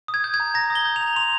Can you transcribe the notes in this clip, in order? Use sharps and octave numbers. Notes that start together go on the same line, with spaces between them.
D#6
G#6
G6
G#6
A#5
A#5 A#6
D#6
G7
G6
F7
A#5
C6 F7